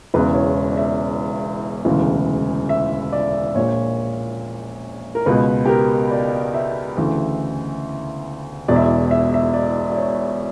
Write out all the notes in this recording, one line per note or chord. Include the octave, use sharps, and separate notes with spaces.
E1 E2 C#3 B4
C#5
D5
E5
E1 D2 C#3 E3
E5
D5
A#1 A#2 C#5
A#4
C#2 B2 B4
G4
A#4
D5
E5
D2 C#3 E3
E1 E2 B2 D5
E5
D5
E5
E5
D5
D5
C#5